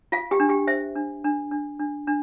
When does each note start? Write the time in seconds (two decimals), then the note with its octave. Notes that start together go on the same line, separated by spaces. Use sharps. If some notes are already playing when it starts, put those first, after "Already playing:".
0.12 F4 F5
0.31 G4 G5
0.40 D4
0.49 G4 G5
0.67 C5 E5
0.95 D4
1.24 D4
1.51 D4
1.79 D4
2.07 D4